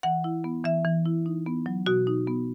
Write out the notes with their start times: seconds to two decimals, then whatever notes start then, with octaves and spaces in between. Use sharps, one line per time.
0.03 E3 F#5
0.24 E4
0.44 B3
0.64 E3 E5
0.85 E3
1.06 E4
1.26 D#4
1.46 B3
1.66 F#3
1.86 B2 F#4
2.07 D#4
2.27 B3